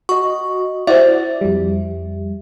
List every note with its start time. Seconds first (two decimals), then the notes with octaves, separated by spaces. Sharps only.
0.09 F#4 D#5 C#6
0.87 E4 F#4 C5 D5 E5
1.41 F2 G3